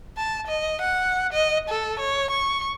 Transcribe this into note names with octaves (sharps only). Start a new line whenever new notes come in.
A5
D#5
F#5
D#5
A4
C#5
C#6